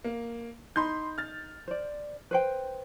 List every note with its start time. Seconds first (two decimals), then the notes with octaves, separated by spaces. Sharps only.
0.04 A#3
0.76 D#4 B5 C6 G6
1.18 F6 A6
1.68 C5 D5
2.31 B4 C5 G5